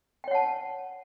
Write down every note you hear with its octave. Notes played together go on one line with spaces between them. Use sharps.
C#5 F#5 G5 A5